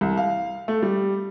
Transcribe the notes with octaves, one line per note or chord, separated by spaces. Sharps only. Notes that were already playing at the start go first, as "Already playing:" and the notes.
C2
F5
A3
G3